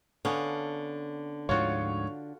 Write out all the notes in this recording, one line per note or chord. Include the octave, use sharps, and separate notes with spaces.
D3 B3 C#4 F5
D2 G#2 F3 F4 F#4 C#5